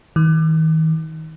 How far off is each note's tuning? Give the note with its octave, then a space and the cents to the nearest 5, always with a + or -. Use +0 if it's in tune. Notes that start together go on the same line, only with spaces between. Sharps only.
D#3 +40